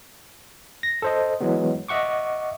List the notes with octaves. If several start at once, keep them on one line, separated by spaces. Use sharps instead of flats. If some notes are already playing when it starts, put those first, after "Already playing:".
A#6
A4 C5 D#5
E3 F#3 G#3 B3
D#5 E5 F#5 C#6 D6